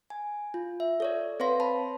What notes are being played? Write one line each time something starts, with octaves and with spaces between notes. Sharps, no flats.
G#5
F4
E5
A4 C#5 D5
C4 B4 C#5 F5 C6 A#6
A5 B5